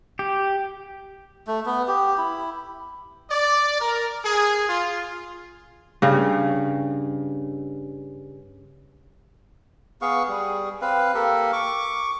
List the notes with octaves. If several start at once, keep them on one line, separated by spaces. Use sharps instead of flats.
G4
A3
B3
G4
E4
D5
A#4
G#4
F4
G2 C#3
B3 G#4 F5 C#6
G3 G#4
C4 B4 F5
A#3 G4 A4 A#4
C#6 D6